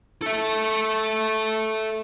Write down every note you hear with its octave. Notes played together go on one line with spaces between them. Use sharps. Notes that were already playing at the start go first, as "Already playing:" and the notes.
A4 E5